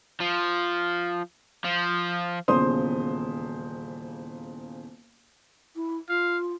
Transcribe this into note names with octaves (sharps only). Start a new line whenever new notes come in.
F3
F3
D#1 E2 C#3 C5 C6 D#6
E4
F4 F5